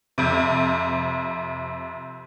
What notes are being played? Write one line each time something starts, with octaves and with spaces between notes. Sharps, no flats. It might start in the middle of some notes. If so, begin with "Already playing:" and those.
F2 C3